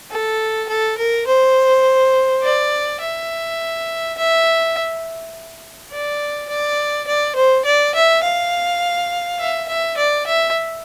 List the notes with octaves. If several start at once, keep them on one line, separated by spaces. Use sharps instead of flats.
A4
A4
A#4
C5
D5
E5
E5
D5
D5
D5
C5
D5
E5
F5
E5
E5
D5
E5